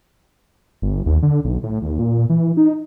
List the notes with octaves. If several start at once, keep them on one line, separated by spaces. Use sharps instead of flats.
G1
D#2
D3
B1
A2
D#2
A#2
A#2
E3
D#4